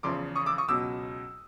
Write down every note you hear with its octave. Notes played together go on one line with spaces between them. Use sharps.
E2 C#3 F3 C6 D6
C#6 D#6
D6 E6
C#6 D#6
C#2 B2 F#3 D6 E6